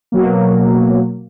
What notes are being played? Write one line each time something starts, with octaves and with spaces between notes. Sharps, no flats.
B2 F#3 A#3